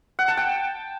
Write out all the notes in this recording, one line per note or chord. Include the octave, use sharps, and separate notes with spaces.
F#5
A5
G5